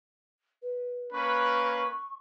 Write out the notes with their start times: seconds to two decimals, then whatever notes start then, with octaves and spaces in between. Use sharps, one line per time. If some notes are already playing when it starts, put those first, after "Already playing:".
0.62 B4
1.13 A#3 C#4 B4 C#6